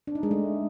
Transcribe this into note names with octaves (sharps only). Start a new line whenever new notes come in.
D4
D#4
G#3
A3